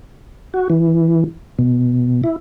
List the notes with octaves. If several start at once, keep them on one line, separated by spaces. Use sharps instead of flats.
F#4
E3
B2
E4